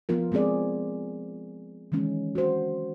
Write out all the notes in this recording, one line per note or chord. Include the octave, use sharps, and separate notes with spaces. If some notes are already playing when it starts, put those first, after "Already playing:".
F3 B3 F4 A#4
G#3 B3 C4 G#4 D5
D#3 E3 G#3 C#4
F#4 C5